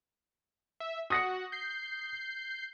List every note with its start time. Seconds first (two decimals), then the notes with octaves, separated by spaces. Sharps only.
0.80 E5
1.10 F#4 F#5 D#6 A#6 C#7
1.52 G6 C7